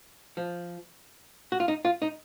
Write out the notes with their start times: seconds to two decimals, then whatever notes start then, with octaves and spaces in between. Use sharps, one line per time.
0.37 F3
1.52 F#4
1.60 F4
1.68 D#4
1.85 F4
2.02 D#4